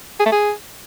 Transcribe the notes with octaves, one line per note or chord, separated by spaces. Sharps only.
G#4
A3
G#4